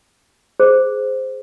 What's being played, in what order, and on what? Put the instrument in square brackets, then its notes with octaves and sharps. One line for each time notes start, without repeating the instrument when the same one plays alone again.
[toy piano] G#4 C5